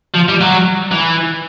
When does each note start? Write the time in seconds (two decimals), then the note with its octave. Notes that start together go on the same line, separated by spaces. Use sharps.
0.15 F3
0.29 G3
0.41 F#3
0.91 E3